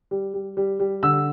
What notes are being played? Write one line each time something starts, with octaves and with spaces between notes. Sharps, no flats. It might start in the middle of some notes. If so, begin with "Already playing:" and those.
G3
G3
G3
G3
D3 E6